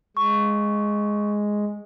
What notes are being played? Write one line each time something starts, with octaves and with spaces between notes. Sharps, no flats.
G#3 C#6